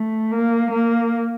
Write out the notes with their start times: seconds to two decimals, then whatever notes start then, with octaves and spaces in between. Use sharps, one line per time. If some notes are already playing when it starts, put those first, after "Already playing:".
Already playing: A3
0.31 A#3
0.72 A#3